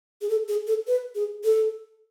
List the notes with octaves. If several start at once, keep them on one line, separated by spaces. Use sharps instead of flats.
G#4
A4
G#4
A4
B4
G#4
A4